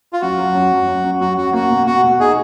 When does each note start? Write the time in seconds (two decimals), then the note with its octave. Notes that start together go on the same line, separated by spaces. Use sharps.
0.13 F4
0.21 F#2 F#4
0.38 F#3
0.55 F#2
0.72 F#2
0.87 F#2
1.04 F#2
1.20 F#2 F#4
1.37 F#2 F#4
1.53 A#3 F#4
1.70 B2
1.86 B2 F#4
2.04 B2
2.20 D#4 G#4